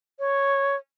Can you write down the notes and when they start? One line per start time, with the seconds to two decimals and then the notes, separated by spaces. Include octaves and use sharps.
0.19 C#5